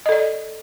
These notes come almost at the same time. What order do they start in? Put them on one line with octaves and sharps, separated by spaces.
D#5 A4 D5